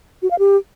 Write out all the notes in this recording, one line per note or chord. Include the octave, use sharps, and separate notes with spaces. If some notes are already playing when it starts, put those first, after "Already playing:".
F#4
F5
G4